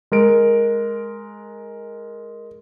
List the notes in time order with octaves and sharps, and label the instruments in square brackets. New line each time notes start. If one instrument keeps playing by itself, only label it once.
[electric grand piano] G#3 A#4 D7